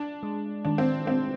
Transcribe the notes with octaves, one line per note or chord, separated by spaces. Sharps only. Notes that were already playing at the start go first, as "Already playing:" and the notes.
Already playing: D4
G#3
D#3 D4
C4
G#3 C4